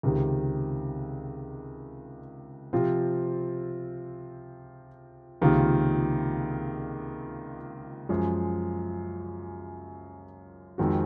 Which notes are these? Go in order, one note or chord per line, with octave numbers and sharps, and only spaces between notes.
C#2 C3 D#3
C3 F3 C4 F4
C#2 C3 D#3 A#3 F4
F#2 F3 G#3
F2 D#3 G#3 C4 F#4